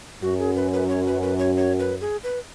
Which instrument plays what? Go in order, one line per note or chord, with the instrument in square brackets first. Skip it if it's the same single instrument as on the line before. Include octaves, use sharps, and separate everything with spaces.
[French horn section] F#2 [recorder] F#4
[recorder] G#4
B4
B4
C#5
B4
B4
C#5
C#5
B4
G#4
B4